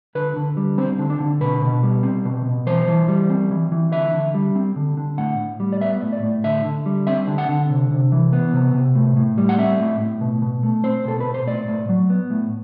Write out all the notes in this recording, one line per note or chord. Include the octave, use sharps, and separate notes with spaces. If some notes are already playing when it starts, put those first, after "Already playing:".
D3 B4
D3
G3
C4 C5
D3
D4
D3
B2 B4
B2
G3
C4
B2
B2
E3 C5
E3
G3
C4
E3
E3
D3 E5
D3
G3
C4
D3
D3
A2 F#5
A2
G3
D5
B3 E5
A2
D5
A2
D3 E5
D3
G3
C4 E5
D3
F#5
D3
C3
C3
E3
B3
C3
C3
A2
A2
G3
F#5
C4 E5
A2
A2
B2
B2
A3
C4 C5
B2 A4
B4
B2
C5
A2 D5
A2
F#3
B3
A2